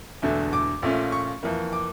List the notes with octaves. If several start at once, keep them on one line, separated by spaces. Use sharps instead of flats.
E1 E2 D3 A3 D4
D6
A#1 A#2 A3 C#4
C#6
F2 E3 A#3
D6